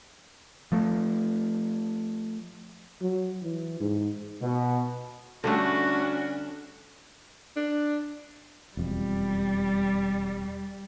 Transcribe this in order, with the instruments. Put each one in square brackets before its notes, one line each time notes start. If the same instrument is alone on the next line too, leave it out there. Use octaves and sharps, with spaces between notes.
[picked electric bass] F3 A3
[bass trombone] F#3
E3
G#2
[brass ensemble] B2
[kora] D3 G3 A3 [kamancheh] C#4 D4 [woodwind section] F#4
[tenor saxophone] D4
[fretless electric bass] E1 F2 [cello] G3